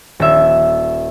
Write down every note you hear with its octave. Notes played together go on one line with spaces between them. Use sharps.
D#1 E5